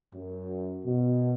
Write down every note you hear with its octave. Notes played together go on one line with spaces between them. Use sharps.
F#2
B2